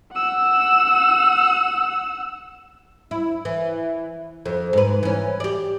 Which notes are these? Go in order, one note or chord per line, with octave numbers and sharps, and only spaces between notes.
F#5 E6
E4
E3
F2
G#2 B4
E3 C#4
G4 D5